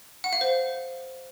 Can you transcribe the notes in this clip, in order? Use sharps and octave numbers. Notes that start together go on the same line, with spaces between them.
F#5
F5
C5